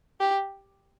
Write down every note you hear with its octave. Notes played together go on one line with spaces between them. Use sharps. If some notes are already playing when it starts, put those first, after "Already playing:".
G4